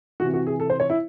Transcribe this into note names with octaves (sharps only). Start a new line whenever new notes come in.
C3 E3 F#4
F#4
G#4
A4
C5
C#5
E4